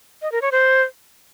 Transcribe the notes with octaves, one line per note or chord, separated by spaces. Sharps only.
D#5
A#4
C#5
C5